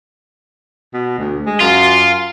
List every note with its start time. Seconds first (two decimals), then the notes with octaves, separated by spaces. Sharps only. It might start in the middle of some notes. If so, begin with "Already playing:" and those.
0.93 B2
1.18 D2
1.46 G#3
1.60 F#2 F4